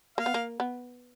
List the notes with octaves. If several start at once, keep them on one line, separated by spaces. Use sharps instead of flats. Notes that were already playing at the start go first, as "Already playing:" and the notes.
A#3 F5
B3
A#3
B3